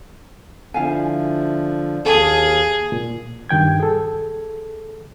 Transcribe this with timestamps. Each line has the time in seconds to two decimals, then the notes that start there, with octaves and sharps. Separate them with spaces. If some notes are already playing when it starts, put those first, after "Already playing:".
0.74 D3 F3 E4 F5 G#5
2.05 D#2 G#4 A4 F5
2.92 A#2
3.49 G2 D#3 G5 G#6
3.80 G#4 A4